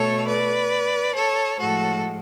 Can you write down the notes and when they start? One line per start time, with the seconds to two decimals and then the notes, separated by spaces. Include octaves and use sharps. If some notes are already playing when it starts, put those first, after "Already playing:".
Already playing: B2 A3 A4 C#5
0.27 B4 D5
1.15 A4 C#5
1.59 A2 F3 G#3 F#4 A4